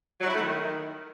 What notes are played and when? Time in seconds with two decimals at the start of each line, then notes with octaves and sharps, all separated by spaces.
0.21 F#3
0.27 E4
0.34 A3
0.40 D#3